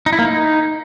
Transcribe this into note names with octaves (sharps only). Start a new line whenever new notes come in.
D#4
E4
A#3
D#4